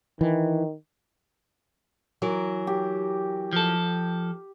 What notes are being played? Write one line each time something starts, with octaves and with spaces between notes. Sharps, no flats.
D#3 E3
E3 F#3 A#4
G4
F3 A4